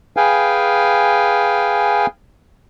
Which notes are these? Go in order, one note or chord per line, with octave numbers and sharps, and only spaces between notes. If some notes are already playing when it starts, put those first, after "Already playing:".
G#4 B4 F5 G5 G#5